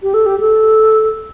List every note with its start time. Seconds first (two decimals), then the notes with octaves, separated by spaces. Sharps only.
0.03 G4
0.14 A4
0.26 G4
0.40 A4